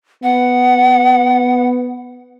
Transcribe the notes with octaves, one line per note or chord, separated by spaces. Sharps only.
B3 F#5